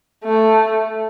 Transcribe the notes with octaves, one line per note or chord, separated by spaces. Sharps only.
A3